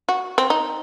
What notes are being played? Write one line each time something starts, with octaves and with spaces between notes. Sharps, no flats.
F#4
C4
D#4